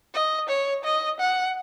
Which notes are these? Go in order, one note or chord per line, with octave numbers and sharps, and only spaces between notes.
D#5
C#5
D#5
F#5